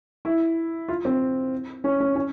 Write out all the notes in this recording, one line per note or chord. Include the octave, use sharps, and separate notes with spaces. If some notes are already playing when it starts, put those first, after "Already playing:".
E4
F4
C4
C#4
C#4
C#4